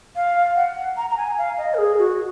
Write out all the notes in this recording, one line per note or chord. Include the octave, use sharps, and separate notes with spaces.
F5
F#5
A#5
A#5
G#5
F5
D#5
A#4
G#4
F#4